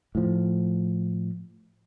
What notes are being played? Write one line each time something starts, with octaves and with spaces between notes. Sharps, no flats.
A2 F3